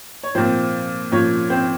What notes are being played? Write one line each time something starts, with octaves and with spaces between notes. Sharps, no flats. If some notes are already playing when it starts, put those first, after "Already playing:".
C#5
A#2 F3 C4 C5
A#2 F3 C#4 C#5
C4 C5